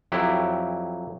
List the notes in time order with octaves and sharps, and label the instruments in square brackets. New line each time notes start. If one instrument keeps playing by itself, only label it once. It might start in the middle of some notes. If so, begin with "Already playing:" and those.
[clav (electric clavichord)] F2 F#3 E4 G4